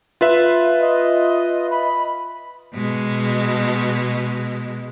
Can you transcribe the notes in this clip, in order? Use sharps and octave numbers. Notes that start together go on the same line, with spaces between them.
F4 B4 E5
D#5
B5
B2 G#3